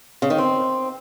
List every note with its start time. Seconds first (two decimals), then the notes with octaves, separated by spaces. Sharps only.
0.22 C#3
0.30 D#3
0.38 C4